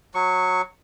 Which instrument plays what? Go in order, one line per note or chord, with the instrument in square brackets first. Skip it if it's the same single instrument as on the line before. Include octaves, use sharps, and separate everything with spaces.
[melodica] F#3 C#6